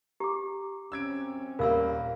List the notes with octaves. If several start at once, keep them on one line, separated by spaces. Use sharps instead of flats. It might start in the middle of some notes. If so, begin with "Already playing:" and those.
G4 A#5 D6
F#2 C4 C#4 E6 G#6 D7
D#1 G3 A#3 A#4 E5 F5 B5 E6